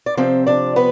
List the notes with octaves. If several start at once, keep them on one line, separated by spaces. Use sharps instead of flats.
D5
C3 F3 C4 C5
D4 D5
B3 B4